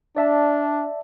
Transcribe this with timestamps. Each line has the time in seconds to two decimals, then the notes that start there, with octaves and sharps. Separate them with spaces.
0.16 D4 D5 E5 A5